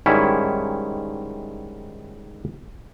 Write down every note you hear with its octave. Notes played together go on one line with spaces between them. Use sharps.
G#2 D#3 G3 C#4 E4